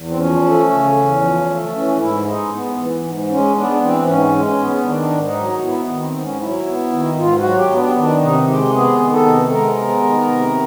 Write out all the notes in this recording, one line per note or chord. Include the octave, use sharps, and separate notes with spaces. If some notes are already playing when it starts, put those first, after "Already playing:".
Already playing: E2
C4
F3 C#4
A3
C#3
E2
F3
A3
E3 C#4
G#2 E4
G#3 D#4
B3
E3
G#2
G#3 C#4
B3 D4
E3 C4
G#2 C#4
G#3
C#4
B3
D#3 D4
G#2
D#4
F#3
B3 E4
D#3
C4
G#2
C#4
F#3 E4
B3
D#3
G#2 F4
F#4
F#3
G4
B3
D4
D#3 D4
C3 D#4
G#3 G4
B3 G#4
D#3
A4
C3
G#3 A#4
B3
D#3
C3